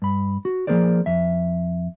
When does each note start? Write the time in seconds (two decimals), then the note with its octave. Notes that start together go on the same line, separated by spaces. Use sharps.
0.02 G2 B5
0.45 F#4
0.67 F3 A#3 G#4 A#4 C5 D5
1.06 F2 E5